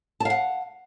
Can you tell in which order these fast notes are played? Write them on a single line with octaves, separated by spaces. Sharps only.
A5 F5 F#5